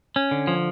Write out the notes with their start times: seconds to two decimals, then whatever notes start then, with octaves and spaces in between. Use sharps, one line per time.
0.16 C#4
0.31 D3
0.47 F3